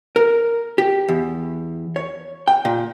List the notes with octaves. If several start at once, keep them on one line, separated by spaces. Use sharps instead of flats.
A#4
G4
E2
C#5
G5
A#2